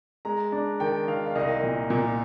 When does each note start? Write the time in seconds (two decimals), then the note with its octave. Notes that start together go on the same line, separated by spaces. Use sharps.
0.25 G#3 A#5
0.52 D4
0.80 D#3 G5
1.08 D#3 F5
1.26 F5
1.35 C2 D#5
1.63 A#2
1.90 A#2